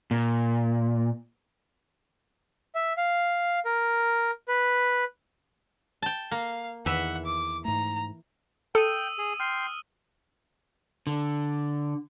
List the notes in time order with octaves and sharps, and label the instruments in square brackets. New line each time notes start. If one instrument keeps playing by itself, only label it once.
[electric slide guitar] A#2
[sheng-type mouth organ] E5
F5
A#4
B4
[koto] G5 A5
[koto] A#3 [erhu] F5
[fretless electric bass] E2 D#3 [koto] E3 E5 [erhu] F#5
[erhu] D6
[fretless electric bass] G#2 A3 [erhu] A#5
[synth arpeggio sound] A4 [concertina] G5 [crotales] D#6 E6 D#7
[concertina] G#4
[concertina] G5 C6 [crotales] F6
[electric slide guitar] D3